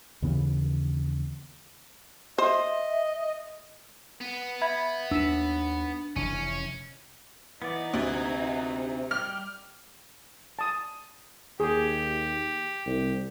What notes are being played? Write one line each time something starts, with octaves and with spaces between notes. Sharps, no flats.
D#2 C#3 E3 B3
C5 D#5 E5
B3
E5 B5 G#6
D#2 D4 E6 B6 E7
F1 E3 C#4 D#7
E3 B3 D#4 D5
D2 C3 B3 G#4
G3 G4 F6
A5 D#6
D#2 G4 G#4
C2